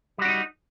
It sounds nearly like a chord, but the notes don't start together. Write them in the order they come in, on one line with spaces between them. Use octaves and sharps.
G3 F#4 D4 D#4